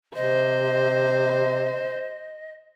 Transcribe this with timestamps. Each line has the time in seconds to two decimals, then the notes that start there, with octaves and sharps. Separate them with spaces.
0.15 C3 C5 D#5